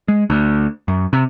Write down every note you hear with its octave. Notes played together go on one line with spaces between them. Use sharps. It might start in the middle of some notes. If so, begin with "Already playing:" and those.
G#3
D2
F#2
C3